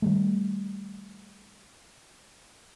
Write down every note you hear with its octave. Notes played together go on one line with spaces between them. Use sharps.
D#3 G3 A3